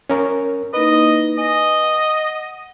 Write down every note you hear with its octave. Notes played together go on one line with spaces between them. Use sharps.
C#4 A#4
A#3 D#4 E4 B4 D#5
D#5 G#5
F#5